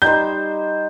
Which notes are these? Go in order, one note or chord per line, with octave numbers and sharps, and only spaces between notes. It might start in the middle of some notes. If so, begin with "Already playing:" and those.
G3 D#4 C5 G6